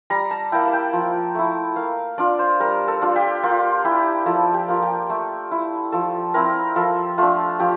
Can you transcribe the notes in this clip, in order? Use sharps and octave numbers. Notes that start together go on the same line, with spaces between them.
G3 A#5
A5
A#3 E4 G5
A5
G5
F3
A3 E4
A#3 F5
D4 F4 D5
C5
G3 A#4
A4
D4 F4
G4
A#3 F4
E4 G4
F3 A4
G4
A#3 F4
G4
A3 A4
E4
F3 A4
C4 E4 A#4
F3 A4
A3 D4 F4
F3 G4